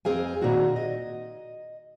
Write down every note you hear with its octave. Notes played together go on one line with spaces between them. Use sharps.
F2 C4 G#4 F5 G#5
A#2 D#3 C4 D#4 F#4 G#4
D#5